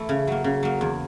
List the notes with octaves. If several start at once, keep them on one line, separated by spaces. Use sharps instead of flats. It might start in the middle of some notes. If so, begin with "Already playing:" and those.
Already playing: E3 A3
C#3
F#3 A#3
C#3
F#3 A#3
E2